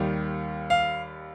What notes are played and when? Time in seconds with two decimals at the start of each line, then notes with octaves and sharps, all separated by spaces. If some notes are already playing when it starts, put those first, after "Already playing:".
Already playing: D#2 D#3 G3
0.70 F5